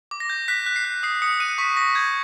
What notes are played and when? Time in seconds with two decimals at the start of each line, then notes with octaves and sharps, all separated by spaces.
0.11 D6
0.20 A#6
0.30 G6
0.48 F#6 B6
0.66 F#6
0.76 C7
0.85 F#6
1.03 D#6 C7
1.22 D#6 C#7
1.40 F#6 D#7
1.58 C#6 B6
1.77 C#6 A#6
1.95 G6 G#6